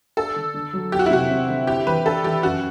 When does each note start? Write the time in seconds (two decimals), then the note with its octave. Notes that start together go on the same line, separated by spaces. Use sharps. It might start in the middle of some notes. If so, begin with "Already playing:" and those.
0.17 D4 A4
0.36 D3
0.54 D3
0.73 F#3
0.92 E2 G4
0.99 F#4
1.06 E4
1.11 C3 F#4
1.31 C4
1.49 D3
1.67 E4 G4
1.87 E3 B4
2.05 D4 A4
2.24 E3 G4
2.43 F#2 F#4